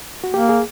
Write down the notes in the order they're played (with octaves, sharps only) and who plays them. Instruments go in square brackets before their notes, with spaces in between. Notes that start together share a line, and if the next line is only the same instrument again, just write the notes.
[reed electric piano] F#4
[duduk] A#3 [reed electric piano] G4
[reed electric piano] G#4